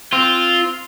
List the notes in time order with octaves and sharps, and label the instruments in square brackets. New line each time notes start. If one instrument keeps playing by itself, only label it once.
[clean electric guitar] C4 [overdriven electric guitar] F4